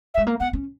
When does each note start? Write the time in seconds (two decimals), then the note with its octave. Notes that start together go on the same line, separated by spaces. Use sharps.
0.14 E5
0.18 G#3
0.27 A#3
0.40 B3 F#5
0.53 C#4